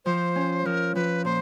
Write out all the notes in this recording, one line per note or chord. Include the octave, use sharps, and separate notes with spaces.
F3 C5
C#4
F3 A#4
F3 B4
A#2 C5